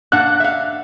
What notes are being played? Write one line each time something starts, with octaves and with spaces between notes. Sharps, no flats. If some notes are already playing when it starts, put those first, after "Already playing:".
A#3 D4 F#5 F#6
E5 F5